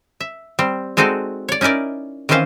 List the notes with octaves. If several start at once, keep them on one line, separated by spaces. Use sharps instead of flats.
E5
G3 C4
G#3 C4 D#4 F#4 A4 D5
C#5 D5
C#4 D#4 E4 A#4 D5
D#3 E3 C4 C#4 C5 F5